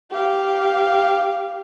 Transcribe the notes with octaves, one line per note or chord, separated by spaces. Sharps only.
G4 F5